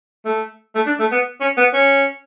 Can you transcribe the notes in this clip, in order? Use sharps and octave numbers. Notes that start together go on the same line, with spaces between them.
A3
A3
D4
A3
B3
C#4
B3
C#4